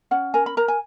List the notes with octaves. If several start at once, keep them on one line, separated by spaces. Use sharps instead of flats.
C#4 F#5
A#4 G#5
B5
A#4 A#5
G#5